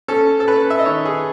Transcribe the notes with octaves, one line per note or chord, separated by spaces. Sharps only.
C#4 A4
A4
C#4 B4
E5
D#5
D#3 C#5
G#4